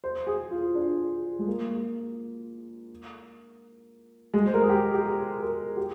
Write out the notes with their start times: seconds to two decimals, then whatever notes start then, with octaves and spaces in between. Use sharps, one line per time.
0.04 C5
0.27 G#4
0.51 F4
0.75 D4
1.39 G#3
1.47 A#3
4.34 G#3
4.47 C5
4.54 A#4
4.62 G#4
4.69 G4
4.94 G4
5.05 G#4
5.42 A#4
5.77 G4